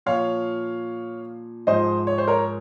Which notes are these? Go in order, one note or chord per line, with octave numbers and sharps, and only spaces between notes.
A#2 F3 C#5 F5
G#2 F3 C5 D#5
C#5
C5
A#4 C#5